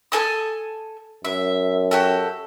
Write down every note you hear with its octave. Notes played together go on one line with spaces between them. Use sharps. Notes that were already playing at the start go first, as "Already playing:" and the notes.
A4 G#5 D#6
F#2 E5
F#4 G4 A4